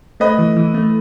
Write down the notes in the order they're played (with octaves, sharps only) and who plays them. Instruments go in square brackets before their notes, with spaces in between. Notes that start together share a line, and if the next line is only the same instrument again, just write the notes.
[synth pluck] A3 [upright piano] B4 D#5
[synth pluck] E3
E3
A3